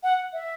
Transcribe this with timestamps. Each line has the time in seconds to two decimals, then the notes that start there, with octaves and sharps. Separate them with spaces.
0.03 F#5
0.33 E5